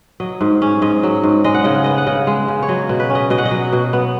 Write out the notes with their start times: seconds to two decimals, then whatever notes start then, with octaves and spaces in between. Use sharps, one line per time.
0.20 F#3 D#5
0.41 G#2
0.62 C#4
0.82 G#2 D#5
1.03 F#3
1.23 G#2
1.44 G#3 D#5
1.54 F#5
1.64 C#3 D#5
1.75 F#5
1.84 B3 D#5
1.98 F#5
2.07 C#3 D#5
2.27 G#3
2.48 C#3
2.63 C#5
2.69 F#3 D#5
2.89 B2
3.00 B4
3.10 C#4
3.15 D#5
3.30 B2 D#5
3.38 F#5
3.45 D#5
3.51 F#3
3.73 B2
3.93 B3